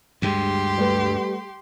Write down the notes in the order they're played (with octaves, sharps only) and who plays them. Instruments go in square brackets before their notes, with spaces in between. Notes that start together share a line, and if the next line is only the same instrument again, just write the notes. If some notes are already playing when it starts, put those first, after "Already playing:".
[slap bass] D2 G2 G#3 [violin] G4 C6
[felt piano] G3 A3 B4